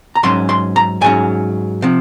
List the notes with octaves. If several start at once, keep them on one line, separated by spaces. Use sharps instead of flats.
A#5
G#2 F#3 C#4 C6
C6
A#5
G#2 F#3 C#4 G#5
C3 F3